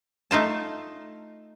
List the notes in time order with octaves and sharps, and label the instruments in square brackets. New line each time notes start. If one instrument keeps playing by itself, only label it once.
[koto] A3 D#4 F4 A5